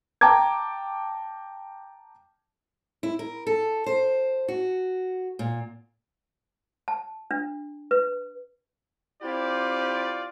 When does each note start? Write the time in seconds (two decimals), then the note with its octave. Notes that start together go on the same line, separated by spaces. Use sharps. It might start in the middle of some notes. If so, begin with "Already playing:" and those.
0.21 G5 A5 A#5 D6 G#6
3.03 E4
3.19 A#4
3.47 A4
3.86 C5
4.48 F#4
5.39 A#2
6.88 A5
7.31 D4
7.91 B4
9.23 C4 E4 F4 G4 D5